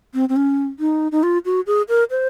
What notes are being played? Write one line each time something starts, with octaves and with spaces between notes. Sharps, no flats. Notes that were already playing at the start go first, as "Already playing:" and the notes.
C4
C4
C#4
D#4
D#4
F4
F#4
G#4
A#4
C5